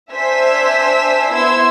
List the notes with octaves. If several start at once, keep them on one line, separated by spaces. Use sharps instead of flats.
D4 C5 E5 G#5 E6 B6
B3 E4 C5 C6 E6 G#6